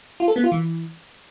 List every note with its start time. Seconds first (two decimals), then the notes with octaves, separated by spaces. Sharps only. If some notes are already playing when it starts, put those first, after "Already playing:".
0.20 F4
0.28 A4
0.36 B3
0.44 F4
0.52 E3